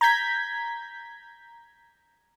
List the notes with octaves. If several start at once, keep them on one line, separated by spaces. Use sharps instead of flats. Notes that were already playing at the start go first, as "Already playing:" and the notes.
A#5 G6 G#6 B6